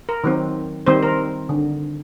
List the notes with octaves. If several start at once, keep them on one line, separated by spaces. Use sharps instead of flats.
A#4
D#3 F#3 C4
D#3 G3 C4 C5
A#4
D3